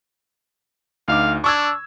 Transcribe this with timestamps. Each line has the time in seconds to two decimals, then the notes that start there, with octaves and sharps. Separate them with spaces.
1.08 D2 D#4 F5 D6
1.44 D4 C#6 E6 G#6